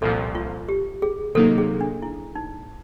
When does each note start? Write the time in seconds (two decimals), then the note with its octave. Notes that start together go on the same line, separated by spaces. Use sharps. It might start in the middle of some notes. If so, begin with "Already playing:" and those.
0.01 C2 A#2 F3 A4
0.35 F4
0.69 G4
1.02 G#4
1.35 C3 D#3 F#3 A#3 D#4 A4
1.58 G#4
1.81 D4
2.02 E4
2.35 D#4